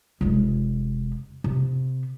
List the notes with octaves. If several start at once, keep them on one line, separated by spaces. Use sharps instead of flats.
F1 G#3
C3